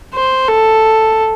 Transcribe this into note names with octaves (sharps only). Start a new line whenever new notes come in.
C5
A4